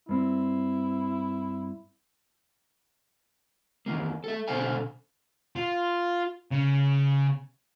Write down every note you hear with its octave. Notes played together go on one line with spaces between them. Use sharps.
G2 C4 E4
D#3 E3 A#3
A4 E5
B2 D3 A4 C5 F5 G#5
F4
C#3